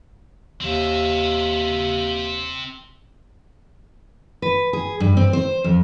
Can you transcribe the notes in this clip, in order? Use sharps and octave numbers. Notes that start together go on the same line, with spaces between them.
D#2 C4 E5
B4
G#4
G2
C4
C5
F2